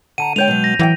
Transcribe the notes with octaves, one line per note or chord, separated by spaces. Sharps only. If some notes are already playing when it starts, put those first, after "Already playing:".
D3 F#5 A5 A#5 D#7
D3 G#3 C#5 G5 G6 F7
B2 F#3
A#6
E3 F#3 F#5 G5